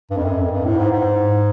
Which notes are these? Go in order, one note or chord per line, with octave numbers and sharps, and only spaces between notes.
G2
F2
F#2
F2
G2
A2
G#2
G#2